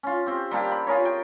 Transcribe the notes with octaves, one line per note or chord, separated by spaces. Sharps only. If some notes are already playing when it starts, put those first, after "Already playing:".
C#4 F4
C4 G4
G3 A#3 D4 G4
B5
F4 G#4 A#4 C#5
G5